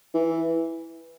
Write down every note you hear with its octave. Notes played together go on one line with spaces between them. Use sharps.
E3